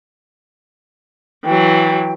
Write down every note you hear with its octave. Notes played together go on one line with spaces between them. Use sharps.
E3 F#3 G5